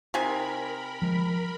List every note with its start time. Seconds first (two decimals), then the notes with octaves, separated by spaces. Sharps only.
0.14 C3 D#4 A#4 G#5 B5
1.02 F3 G#3